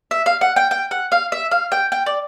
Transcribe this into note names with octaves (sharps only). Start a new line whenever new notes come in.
E5
F5
F#5
G5
G5
F#5
F5
E5
F5
G5
G5
D5